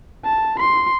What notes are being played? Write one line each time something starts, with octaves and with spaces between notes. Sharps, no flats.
A5
C6